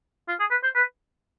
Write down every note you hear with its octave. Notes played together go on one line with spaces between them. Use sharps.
F4
G#4
B4
C5
B4